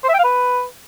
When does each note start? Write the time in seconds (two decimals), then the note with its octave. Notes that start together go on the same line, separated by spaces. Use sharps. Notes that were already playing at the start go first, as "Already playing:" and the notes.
0.04 C5
0.09 E5
0.14 G5
0.19 F5
0.24 B4